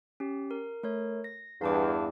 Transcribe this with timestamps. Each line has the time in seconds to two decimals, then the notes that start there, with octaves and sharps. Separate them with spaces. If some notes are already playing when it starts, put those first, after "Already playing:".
0.20 C#4 G4
0.51 A#4
0.83 A3 A#4 C#5
1.24 A#6
1.61 E2 G2 F5 A5 D6